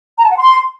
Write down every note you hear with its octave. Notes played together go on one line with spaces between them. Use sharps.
A#5
A5
F#5
C6